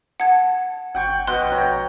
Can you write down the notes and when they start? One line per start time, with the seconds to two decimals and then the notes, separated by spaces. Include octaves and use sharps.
0.20 F#5 A5 G#6
0.95 G1 F#5 G5 C#6
1.27 A#1 B2 C6 F#6
1.52 C#5 G5 A#5